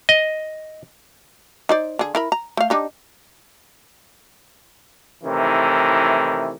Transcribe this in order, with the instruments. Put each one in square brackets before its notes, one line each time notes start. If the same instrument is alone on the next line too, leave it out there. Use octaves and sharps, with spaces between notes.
[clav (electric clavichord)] D#5
[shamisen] D#4 C5 D5
D3 G#4
E4 A#4 B5
A#5
A3 F5
D4 D#4 G4
[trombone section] A2 C3 D#3 E3